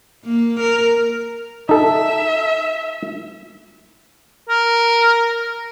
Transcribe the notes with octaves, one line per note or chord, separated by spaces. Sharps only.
A#3
A#4
D#4 A4 E5
A#4